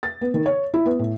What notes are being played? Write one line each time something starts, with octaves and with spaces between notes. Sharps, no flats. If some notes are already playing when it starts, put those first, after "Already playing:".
A6
B3
D#3
C#5
E4
B3
A2